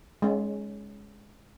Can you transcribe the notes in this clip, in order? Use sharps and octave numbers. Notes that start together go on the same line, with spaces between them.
G#3 C#4